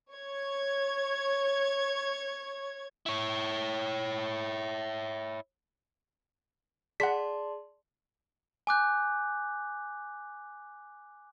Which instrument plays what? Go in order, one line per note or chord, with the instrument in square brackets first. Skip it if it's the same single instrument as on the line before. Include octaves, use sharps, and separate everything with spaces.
[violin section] C#5 G#6
[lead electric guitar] E4 C#5
[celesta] G#4 [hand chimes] D5 A5 C6 [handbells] F#5 B6
[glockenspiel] G#5 D6 F#6 G6